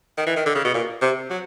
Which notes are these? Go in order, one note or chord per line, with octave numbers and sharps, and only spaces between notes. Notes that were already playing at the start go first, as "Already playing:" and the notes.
D#3
E3
D#3
D3
C#3
B2
A#2
C3
F#3